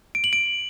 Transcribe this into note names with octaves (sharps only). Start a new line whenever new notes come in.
D7
F#7
D7